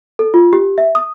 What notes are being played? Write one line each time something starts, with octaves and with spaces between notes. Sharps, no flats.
A4
F4
G4
E5
D#6